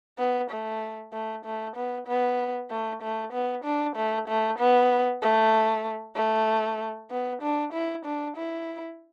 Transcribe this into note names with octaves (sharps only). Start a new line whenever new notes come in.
B3
A3
A3
A3
B3
B3
A3
A3
B3
D4
A3
A3
B3
A3
A3
B3
D4
E4
D4
E4